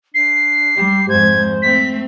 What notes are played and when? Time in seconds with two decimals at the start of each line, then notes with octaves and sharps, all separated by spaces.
0.14 D4 C7
0.77 G3 G4
1.09 F2 G#2 C5 G#6
1.62 A3 C4 B6